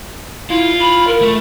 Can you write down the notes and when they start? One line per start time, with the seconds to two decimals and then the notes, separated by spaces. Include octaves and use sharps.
0.50 E4 F4
0.80 B5
1.07 A#4
1.21 A3